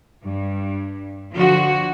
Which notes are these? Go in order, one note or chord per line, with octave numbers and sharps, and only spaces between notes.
G2
D3 F3 F#4